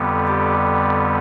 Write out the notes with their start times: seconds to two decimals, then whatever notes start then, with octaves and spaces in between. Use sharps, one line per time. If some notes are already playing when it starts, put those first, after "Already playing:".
Already playing: F2 D3 G3 B3
0.27 G4